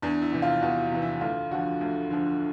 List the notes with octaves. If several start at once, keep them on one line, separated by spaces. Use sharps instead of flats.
E2 D4
E4
C3 E3
F4
E2 F#4
C3 E3
E4
D2 F4
D3 F3 F#4
D2
D3 F3